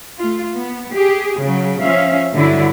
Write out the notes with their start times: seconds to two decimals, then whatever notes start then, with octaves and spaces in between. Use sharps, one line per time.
0.20 A3 F4
0.54 B3
0.93 G4 G#4
1.40 C#3 F#3
1.82 F3 C#4 E5 F5
2.35 G2 D3 F#3 E4